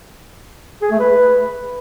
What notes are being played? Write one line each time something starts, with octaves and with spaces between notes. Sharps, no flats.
G#4
A3
B4